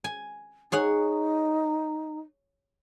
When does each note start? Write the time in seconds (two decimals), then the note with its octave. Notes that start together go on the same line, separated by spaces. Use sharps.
0.04 G#5
0.72 D#4 G#4 C#5 F#5